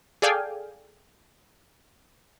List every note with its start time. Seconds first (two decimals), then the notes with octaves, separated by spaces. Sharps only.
0.22 G#4 A4 D5 F5 G5 G#5